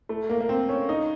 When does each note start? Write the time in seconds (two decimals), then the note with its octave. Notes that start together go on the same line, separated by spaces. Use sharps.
0.09 A3
0.29 A#3
0.41 A#3
0.49 C4
0.69 C#4
0.89 D#4